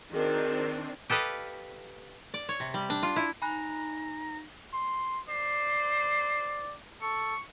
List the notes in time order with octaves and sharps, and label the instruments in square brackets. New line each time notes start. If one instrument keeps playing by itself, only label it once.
[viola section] D#3 C4 D4 [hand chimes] F#4 G#4 A#4
[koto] G4 A4 B4 D#5 F5
D5
C#5
C3
G3
D4
F4
E4
[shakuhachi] D#4 [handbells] G#5 B5 F#6 [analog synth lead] A#5
[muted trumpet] C6
[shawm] C5 [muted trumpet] D5
[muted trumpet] A4 [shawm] C#6